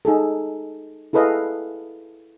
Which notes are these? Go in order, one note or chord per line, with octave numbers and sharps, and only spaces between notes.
D#4 G#4 A4
E4 G#4 A4 B4 D#5 F5